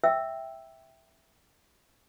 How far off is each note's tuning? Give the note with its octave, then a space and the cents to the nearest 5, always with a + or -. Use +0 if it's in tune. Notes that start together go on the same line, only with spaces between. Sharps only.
E5 +0 G5 +0 E6 +0